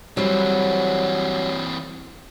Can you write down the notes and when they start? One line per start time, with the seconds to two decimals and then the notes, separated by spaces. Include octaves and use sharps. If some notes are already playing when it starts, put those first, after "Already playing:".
0.17 E3 F#3 G3 C4